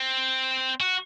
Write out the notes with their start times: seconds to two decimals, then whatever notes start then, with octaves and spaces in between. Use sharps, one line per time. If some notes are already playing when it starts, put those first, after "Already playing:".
Already playing: C4
0.80 F#4